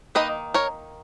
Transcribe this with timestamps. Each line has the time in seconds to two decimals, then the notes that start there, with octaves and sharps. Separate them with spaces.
0.15 D#3 A#3 D#4 B4 D#5
0.54 A#4 C#5